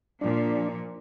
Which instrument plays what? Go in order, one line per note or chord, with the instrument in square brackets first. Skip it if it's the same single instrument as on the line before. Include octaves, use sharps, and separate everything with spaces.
[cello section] A#2 F3 [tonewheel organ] D4